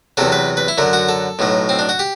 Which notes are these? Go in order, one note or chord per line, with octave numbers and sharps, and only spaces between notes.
E2 C3 F#3 A4
B4
B4
E4
F#2 D3 F#3
F#4
A4
B1 A2 F#3
C4
D4
F#4
G4